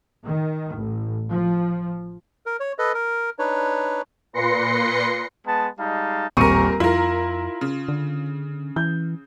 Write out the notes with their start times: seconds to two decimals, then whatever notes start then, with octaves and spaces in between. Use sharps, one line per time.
0.24 D#3
0.76 A1
1.30 F3
2.46 A#4
2.60 C#5
2.79 A4 B4 D#5
2.94 A#4
3.39 D4 D#4 B4 C#5
4.33 A#2 B4 C6 A#6 C7 C#7
5.46 G#3 B3 A5
5.79 G3 G#3 D#4 F5 A5
6.37 D#1 A1 C4 A#4 C#6 D#7
6.80 F2 E4 F4 A#4
7.61 C#3
7.88 D3
8.76 E3 G6